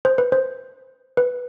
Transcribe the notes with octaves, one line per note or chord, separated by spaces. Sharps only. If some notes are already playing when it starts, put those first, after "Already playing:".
C5
B4
C5
B4